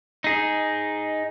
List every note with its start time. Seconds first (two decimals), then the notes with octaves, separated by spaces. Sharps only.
0.24 D#4 G#4